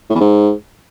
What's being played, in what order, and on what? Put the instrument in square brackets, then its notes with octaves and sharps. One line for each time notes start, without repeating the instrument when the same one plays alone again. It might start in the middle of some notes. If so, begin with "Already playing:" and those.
[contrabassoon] A2
E2
G#2